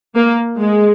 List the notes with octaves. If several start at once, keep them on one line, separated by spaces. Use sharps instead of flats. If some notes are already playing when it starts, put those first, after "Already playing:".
A#3
G#3